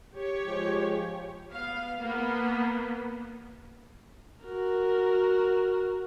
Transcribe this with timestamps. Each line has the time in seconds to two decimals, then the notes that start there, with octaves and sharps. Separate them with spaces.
0.14 G4 C#5
0.45 F3 G#3
1.51 B3 F5
2.04 A#3 B3 B4
4.45 F#4 A#4